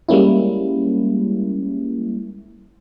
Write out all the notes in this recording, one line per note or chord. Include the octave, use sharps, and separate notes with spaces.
G3 G#3 A#3 C#4 E4